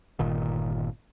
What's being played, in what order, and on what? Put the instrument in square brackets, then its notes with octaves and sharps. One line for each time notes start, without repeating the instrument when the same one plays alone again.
[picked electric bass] G1 A#2 D#3